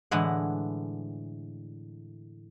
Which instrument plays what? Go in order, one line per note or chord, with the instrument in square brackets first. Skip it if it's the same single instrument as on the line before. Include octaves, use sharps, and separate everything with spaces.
[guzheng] A2 D3 E3 G#3 F#5